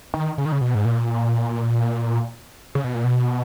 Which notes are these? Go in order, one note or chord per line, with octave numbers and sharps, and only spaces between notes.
D#3
C#3
D#3
C#3
B2
G#2
A#2
C#3
B2
A#2
B2